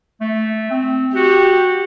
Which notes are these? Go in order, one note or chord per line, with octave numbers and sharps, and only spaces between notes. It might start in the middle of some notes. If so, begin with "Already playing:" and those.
A3
C4
F#4 G4